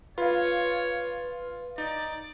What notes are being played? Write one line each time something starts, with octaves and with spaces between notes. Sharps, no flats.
F4 B4 C#5 F5
D#4 D5